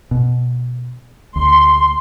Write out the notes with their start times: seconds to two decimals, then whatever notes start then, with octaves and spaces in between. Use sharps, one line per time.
0.11 B2
1.36 D2 C6